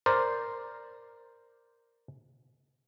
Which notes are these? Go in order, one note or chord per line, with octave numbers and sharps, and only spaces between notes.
A#4 C5 D5